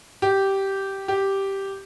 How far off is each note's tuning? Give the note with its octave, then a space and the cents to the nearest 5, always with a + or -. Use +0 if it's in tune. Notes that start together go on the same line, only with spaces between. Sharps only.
G4 -10
G4 -5